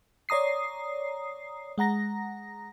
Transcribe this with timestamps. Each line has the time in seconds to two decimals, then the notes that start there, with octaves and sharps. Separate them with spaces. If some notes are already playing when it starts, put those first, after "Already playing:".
0.29 C#5 D5 A#5 D#6 C7
1.78 G#3 F#5 A#5 A#6